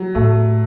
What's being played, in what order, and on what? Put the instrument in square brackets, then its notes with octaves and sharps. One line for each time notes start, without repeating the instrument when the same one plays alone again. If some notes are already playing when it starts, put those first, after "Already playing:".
Already playing: [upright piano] F#3
[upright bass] A2 [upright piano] A3